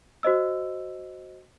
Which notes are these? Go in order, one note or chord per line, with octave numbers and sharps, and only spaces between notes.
F#4 C5 D#5 E6